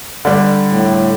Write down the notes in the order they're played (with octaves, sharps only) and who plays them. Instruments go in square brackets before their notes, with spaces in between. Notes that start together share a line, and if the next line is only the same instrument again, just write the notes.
[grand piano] D3 G3
[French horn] A2